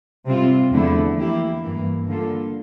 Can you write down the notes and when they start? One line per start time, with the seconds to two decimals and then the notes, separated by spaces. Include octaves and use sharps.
0.25 C3 G3 C4 F4
0.71 E2 D3 F3 A3 E4
1.17 E3 A#3 E4 G4
1.62 G2 E3 A#3
2.08 D3 G3 A#3 F4 A4